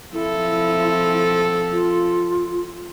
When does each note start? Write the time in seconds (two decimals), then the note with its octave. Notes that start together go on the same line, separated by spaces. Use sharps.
0.13 F3 C4 E4 A4
1.72 F4